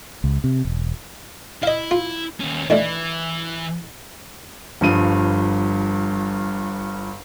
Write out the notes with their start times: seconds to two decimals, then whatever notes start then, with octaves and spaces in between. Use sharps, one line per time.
0.24 C#2
0.44 C3
0.65 E1
1.63 E4 D#5 F5
1.91 F4
2.40 D#2 C#4
2.70 D#3 E3 A3 D4
4.81 G1 G2 F3 D#7